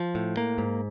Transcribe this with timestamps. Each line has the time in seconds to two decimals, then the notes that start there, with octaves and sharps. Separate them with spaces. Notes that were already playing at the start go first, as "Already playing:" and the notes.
Already playing: F3
0.15 A2
0.37 A#3
0.58 G#2